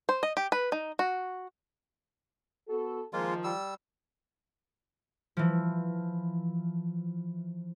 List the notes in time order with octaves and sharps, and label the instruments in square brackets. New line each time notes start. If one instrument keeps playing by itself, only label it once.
[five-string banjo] C5
D#5
G4
B4
D#4
F#4
[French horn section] B3 F#4 A4
[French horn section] D#3 F3 [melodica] G#3 A#3 F4
[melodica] G3 E6
[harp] E3 F3